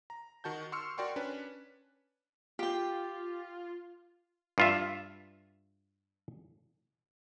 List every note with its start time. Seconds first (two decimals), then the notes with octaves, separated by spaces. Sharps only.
0.10 A#5
0.44 D#3 F#4 A5 G6
0.72 C6 C#6 E6 F6 C#7
0.98 F#4 A#4 D5 G5 C6 C#6
1.16 C#4 D4 B4
2.59 F4 G4 G5
4.58 G2 F4 E5